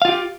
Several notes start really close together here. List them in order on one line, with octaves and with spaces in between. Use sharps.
F5 F4 G4